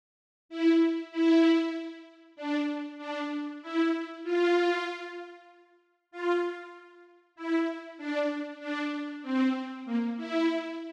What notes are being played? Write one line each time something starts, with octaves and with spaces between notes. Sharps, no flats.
E4
E4
D4
D4
E4
F4
F4
E4
D4
D4
C4
A#3
E4